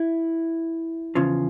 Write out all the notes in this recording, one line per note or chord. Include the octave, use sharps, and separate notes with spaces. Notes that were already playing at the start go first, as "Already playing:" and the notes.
Already playing: E4
E2 C#3 F3